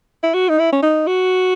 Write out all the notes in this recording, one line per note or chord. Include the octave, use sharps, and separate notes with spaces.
E4
F#4
D#4
E4
C#4
D#4
F#4